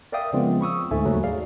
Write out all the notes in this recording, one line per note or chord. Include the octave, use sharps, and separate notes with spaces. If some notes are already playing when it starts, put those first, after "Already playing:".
A#4 D5 E5 F5 G5 D#6
C#3 F3 G#3 B3 C4 F4
B5 C#6 D#6 E6
D2 G#2 A3 E5 G#5
D#2 G#2 C#3 F#3 A4
G#4 D5 F5